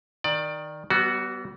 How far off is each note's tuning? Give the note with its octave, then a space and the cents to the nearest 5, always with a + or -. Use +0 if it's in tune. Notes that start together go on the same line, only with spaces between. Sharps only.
D#3 +0 D5 +20
G3 -40 B3 +0 F#4 +0